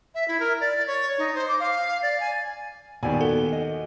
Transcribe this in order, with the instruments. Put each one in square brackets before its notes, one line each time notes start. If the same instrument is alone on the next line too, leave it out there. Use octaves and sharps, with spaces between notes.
[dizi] E5
E4
A#4
D5
C#5
D#4
C5
D6
F5
D5
G#5
[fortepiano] D#2 D5 [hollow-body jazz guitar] A#2 B3 G4 [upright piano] G#5
[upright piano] F#4 [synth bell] A4
[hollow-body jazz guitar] D#5